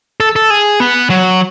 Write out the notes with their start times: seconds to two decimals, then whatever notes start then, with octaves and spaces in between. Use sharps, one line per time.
0.20 A4
0.36 A4
0.50 G#4
0.80 B3
1.10 F#3